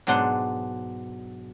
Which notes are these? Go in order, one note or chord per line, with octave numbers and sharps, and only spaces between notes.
G#2 B2 F#3 D4 F#5 C6